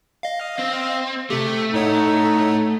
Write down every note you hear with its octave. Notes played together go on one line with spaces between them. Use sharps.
D#5 F5
C4
C3 A3 G4
A2 D#4 C#5 F#5